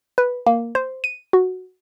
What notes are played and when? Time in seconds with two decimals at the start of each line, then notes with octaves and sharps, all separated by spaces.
0.18 B4
0.47 A#3
0.75 C5
1.04 D#7
1.33 F#4